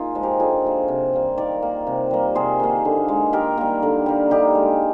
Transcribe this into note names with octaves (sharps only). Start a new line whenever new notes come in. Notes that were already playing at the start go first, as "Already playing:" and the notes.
Already playing: A#3 D#4 F4 G#4
F3 G#3
G4 A#4
D3 F4 G#4
F3 A#3
C3
G3 A#3
D#3 A#4 D5
A#3
C3
G3 A#3
C3 G#4 C5
D#3 A#3
D3
G#3
D#3 G4 A#4
G3 A#3
D3
G3 A#3
D3 D#4 G4
G#3